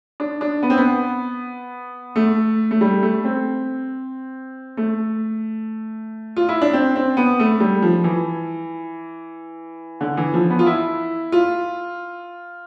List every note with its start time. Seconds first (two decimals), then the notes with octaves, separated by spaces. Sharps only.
0.20 D4
0.41 D4
0.63 B3
0.70 C4
0.78 B3
2.16 A3
2.71 A3
2.81 G3
3.03 A3
3.25 C4
4.77 A3
6.37 F4
6.49 E4
6.62 D4
6.73 C4
6.96 C4
7.17 B3
7.40 A3
7.60 G3
7.82 F3
8.04 E3
10.01 D3
10.17 E3
10.34 F3
10.50 B3
10.59 F4
10.66 E4
11.32 F4